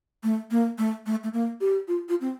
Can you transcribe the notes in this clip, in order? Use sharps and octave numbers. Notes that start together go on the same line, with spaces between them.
A3
A#3
A3
A3
A3
A#3
G4
F4
F4
C4